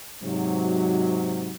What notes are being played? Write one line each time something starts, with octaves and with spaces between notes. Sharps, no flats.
G#2 C3 F#3